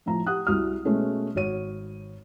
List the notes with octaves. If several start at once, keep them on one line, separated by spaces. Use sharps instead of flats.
A2 F3 A#5
G4 F#5 D#6 F#6
C2 F#4 D#6 F6
B2 G#3 A3 C#4
G#1 F#4 C#5 D#7